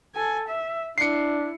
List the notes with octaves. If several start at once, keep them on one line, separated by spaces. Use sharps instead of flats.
A4 G#5
E5
D4 E4 C7 C#7